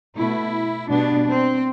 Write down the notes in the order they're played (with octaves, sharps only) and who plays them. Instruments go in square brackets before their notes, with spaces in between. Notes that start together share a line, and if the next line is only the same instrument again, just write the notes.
[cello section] B2 A3 E4
B2 G3 B3 D4
C4